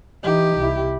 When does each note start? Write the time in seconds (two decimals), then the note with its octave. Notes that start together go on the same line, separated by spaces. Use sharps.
0.23 E3 D#4 G4
0.57 C2 E4